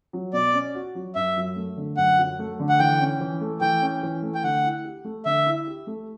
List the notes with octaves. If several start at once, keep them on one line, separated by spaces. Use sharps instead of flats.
F#3
B2 D5
C#4
F#4
F#3
F#2 E5
F#3
A3
D3
F#2 F#5
F#3
A3
D3
F#5
E3 G5
C#4
E3
A3
E3 G5
C#4
E3
A3
G5
D3 F#5
E4
G4
A3
D3 E5
E4
G4
A3